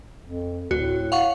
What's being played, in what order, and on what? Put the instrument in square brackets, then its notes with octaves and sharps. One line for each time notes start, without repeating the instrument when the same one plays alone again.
[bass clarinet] F2
[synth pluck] D2 [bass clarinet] A2 [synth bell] F#4
[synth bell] F5 F#5 C#6